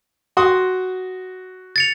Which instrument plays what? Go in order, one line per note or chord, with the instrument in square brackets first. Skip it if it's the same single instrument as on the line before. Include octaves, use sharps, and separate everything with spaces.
[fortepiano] F#4 C6 D#6
[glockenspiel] A6 C#7 F7